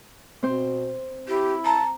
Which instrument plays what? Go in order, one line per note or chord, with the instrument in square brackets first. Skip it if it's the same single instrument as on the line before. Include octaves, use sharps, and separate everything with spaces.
[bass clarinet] B2 [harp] C4 C5
[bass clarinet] E4 [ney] G4
[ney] A5 [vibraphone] A#5